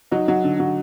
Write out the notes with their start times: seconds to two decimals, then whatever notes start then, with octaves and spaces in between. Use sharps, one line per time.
0.12 F#3 D#4
0.28 F#3
0.44 D3
0.60 F#3